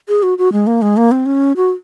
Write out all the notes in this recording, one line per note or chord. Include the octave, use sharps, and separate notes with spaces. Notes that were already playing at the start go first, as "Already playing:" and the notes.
G#4
F#4
F#4
G#3
A#3
G#3
A#3
C4
C#4
F#4